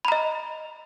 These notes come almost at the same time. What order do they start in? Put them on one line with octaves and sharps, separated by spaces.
B5 A#5 D#5